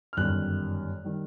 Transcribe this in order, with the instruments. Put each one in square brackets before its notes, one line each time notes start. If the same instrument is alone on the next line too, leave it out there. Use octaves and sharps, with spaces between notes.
[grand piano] F6
G1 F#2 D#3 G3 F#6
D#3 G3